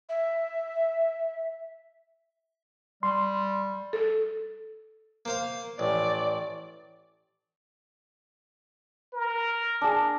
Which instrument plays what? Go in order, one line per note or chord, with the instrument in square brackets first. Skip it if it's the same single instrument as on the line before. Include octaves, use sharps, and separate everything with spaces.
[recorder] E5
[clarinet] G3 [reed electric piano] C6
[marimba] A4
[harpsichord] A#3 C5 F5
[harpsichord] A1 [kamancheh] D5
[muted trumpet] A#4
[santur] D4 G#4